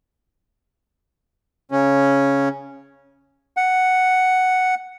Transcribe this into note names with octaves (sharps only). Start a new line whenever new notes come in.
C#3 C#4
F#5